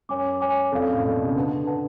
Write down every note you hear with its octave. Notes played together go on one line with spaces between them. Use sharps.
F#2 C#5 G#5 D6
C#5 G#5 D6
F2 A4 D5 F5
F#2
A2
B2 A4 D5 F5
C#3
D3 B4 F#5 A5
B4 F#5 A5